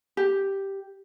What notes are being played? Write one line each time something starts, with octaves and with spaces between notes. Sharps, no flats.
G4